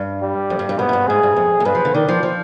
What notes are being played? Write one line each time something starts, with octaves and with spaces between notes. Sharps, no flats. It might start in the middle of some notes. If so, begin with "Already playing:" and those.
Already playing: G2
G3
F2
G2
G2
G#2 B3
G#2
G2
G#2 G#4
G2
F2
F2
G2 B4
F3
D3
D#3 D5
F3
F3